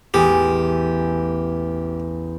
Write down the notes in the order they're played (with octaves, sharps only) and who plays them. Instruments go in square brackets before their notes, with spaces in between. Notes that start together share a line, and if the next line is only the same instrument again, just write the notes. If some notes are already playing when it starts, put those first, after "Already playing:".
[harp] A1 E2 [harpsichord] G4